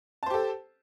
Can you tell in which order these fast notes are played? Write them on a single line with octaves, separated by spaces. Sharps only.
A5 C5 G4 A4